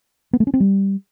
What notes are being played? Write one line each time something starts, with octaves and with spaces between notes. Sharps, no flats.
B3
A3
C#4
C4
G3